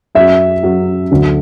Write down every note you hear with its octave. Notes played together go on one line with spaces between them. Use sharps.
F#2 F#3 E5
F#2 F#3
D2 D3 F#3